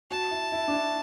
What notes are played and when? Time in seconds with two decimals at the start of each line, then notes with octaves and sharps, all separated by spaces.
0.11 F#4 A5
0.31 E4
0.52 E4
0.68 D4
0.73 E4